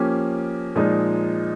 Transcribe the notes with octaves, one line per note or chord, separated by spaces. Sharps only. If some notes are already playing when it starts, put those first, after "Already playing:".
Already playing: F3 A#3 C#4 G4
A#2 F3 G#3 D#4